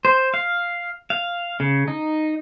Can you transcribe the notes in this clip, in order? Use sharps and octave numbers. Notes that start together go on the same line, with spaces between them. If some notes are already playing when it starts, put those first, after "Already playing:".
C5
F5
F5
C#3
D#4